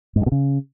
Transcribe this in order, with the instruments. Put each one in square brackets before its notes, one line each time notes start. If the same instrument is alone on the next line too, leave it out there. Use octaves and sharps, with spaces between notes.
[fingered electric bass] G#2
G2
B2
C#3